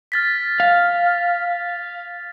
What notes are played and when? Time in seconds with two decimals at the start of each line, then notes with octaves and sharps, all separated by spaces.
0.12 F6 A6 B6
0.60 F5